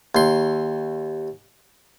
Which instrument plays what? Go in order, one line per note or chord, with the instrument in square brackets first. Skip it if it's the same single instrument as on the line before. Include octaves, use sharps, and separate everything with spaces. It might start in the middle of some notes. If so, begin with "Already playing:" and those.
[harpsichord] D#2 C6